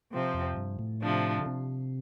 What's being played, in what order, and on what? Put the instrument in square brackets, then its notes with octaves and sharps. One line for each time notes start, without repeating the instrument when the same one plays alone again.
[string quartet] C3 F3 C4
[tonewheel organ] F2
G2
A2
[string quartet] C3 F3 D4
[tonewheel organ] D3
C3